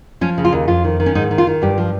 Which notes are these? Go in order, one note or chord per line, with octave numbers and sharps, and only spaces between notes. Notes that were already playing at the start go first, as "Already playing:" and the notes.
F3 C#4
C#3
F4
D#2
F2 F4
D#3
D#3
C#4
G#2 D#4
D#3
F4
D#3
G2 G4
F3